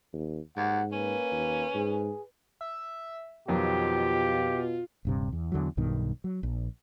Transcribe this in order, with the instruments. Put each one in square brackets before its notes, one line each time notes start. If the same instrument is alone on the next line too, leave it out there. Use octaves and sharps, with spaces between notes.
[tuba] D#2
[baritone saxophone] D#2 [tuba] G#2 [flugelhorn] F#5
[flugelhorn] A#3 [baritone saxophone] C#4 [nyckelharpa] B4
[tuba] D#2
[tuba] G#2 [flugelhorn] G#4
[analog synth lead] E5
[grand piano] F2 D#3 F#3 [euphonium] B2 [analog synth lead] F4 [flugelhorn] G4
[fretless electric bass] D#1 G2 C3
E2
E2 D3 E3 F#3
B1 G2 B2 D#3
F#3
A#1